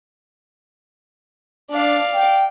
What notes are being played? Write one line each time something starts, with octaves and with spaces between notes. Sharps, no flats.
D4 D5 F5
G5